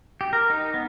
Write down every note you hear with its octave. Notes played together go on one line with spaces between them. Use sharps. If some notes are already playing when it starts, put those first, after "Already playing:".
G4
A#4
D#4
B3